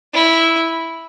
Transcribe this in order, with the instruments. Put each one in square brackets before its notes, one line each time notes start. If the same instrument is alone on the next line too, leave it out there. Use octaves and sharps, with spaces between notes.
[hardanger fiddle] E4